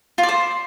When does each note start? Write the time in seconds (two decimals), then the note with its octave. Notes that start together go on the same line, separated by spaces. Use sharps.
0.18 F4
0.23 D5
0.29 C5